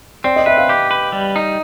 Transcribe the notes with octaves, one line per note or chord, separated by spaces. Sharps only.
C4 D5
D#5
B4 E5
F5
G4
B4
G3
D#4